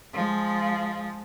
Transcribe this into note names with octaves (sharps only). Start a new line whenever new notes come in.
F3 G#3